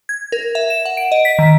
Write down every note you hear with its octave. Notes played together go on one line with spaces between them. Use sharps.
G#6
A#4
E5
E7
F#5
D7
D#5
B6
D#3